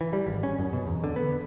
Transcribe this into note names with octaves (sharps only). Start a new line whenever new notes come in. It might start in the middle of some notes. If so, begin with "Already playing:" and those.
E3
G3
G#1
C#4
F#2
B2
E2
D3
B3